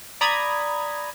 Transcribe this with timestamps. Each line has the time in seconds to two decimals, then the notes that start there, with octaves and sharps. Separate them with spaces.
0.21 D5 A#5 B5 D#6 G#6